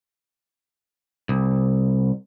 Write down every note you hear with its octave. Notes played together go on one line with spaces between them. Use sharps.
C2